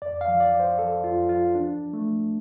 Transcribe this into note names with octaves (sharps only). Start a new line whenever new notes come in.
F2 D5
F5
F3
D5
F3
C5
F3 A4
F2 F4
F3 F4
F3 D4
F3
A3
F3